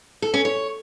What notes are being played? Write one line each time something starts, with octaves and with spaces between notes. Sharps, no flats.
A4
C#4
C#5